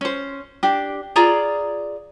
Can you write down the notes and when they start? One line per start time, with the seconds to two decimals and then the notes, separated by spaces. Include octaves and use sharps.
0.01 C#4 C5
0.63 D4 G4
1.16 F4 G#4 D5 A#5